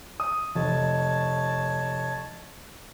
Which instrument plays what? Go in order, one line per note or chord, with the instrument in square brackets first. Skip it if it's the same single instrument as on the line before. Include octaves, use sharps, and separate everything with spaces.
[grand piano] D#6
[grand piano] F1 [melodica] C#5 A5